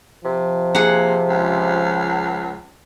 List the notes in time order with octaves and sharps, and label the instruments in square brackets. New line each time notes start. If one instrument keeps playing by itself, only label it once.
[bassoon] C3 [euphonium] F3
[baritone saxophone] A#3 [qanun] G#4 F#5
[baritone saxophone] C#2